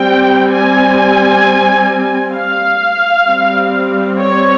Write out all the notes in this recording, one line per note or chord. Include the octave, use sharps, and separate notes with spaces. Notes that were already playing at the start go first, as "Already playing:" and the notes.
Already playing: G3 C4 G5
G#5
F5
G3 C4
C#5